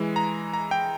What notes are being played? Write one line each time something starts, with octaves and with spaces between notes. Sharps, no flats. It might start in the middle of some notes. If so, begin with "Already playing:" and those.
Already playing: E3 G#3
A#5
A#5
G5